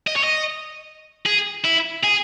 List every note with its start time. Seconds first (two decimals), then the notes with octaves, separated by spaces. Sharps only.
0.07 D#5
0.16 C#5
0.24 D#5
1.26 G#4
1.65 E4
2.04 G#4